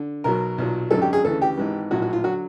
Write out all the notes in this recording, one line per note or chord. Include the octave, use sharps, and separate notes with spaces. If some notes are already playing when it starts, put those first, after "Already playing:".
Already playing: D3
B1 B2 F#3 A#4
B1 A#2 F#3
G#1 F#2 D3 F#3 A4
G4
G#4
D2 C#3 E3 A4
G4
G#1 G#2 E3
A#1 A2 F#3 F#4
F#4
F4
D3 F#3 F#4